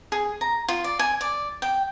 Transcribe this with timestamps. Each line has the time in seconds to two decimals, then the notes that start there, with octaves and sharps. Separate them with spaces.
0.12 G#4
0.41 A#5
0.68 F4
0.84 D5
0.99 G#5
1.21 D5
1.62 G5